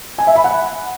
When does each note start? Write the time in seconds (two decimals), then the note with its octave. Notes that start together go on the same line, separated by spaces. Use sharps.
0.18 G#5
0.27 E5
0.36 B5
0.44 F#5